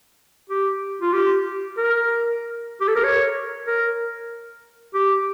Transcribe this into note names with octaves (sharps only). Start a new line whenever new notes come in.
G4
F4
G4
A#4
G4
A4
A#4
C#5
A#4
G4